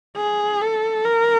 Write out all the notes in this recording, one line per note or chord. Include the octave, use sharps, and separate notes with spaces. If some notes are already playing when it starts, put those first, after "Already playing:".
G#4
A4
A#4